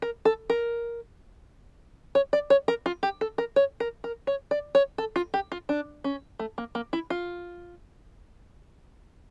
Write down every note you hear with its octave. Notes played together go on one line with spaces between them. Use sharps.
A#4
A4
A#4
C#5
D5
C#5
A#4
F4
G4
A4
A#4
C#5
A#4
A#4
C#5
D5
C#5
A4
F4
G4
F4
D4
C#4
A3
A#3
A#3
E4
F4